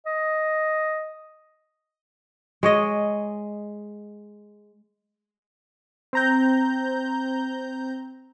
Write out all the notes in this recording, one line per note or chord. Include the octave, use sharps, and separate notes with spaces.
D#5
G#3 C#5 D#5
C4 A#5 G6